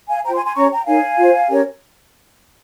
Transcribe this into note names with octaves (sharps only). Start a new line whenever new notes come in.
F5 G#5
F4 C5 G5 A#5
G#5 C6
G#5 C6
C#4 G4 C#5 A#5 C#6
G5 A#5
D#4 A#4 C#5 F5 G#5
F4 C5
C#4 G4 A#4 C#5